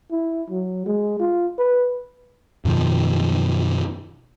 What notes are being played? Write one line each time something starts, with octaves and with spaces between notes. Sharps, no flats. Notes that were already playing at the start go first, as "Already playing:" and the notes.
E4
F#3
G#3
F4
B4
F#2 B2 D#3 F3